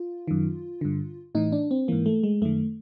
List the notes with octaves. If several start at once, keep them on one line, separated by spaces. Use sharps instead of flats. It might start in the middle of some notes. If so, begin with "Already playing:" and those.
Already playing: F4
F#2 D#3
G2 D3
A2 E3 D#4
D4
C4
G#2 E3 A#3
A3
G#3
F#2 D#3 A3